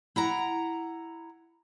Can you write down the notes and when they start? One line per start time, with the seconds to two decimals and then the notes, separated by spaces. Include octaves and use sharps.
0.16 E4 F#5 A#5